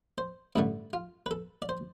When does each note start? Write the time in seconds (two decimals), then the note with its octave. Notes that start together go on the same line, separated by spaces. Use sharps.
0.18 C5
0.56 A1 G2 D3 A3 E4
0.93 F4
1.26 B4
1.31 A4
1.62 D5
1.69 C5